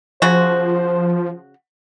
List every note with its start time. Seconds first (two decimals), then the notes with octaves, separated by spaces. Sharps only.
0.22 C#3 F3 F#4 C5